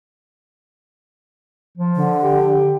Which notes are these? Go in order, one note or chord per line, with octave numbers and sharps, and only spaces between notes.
F3
D3
G4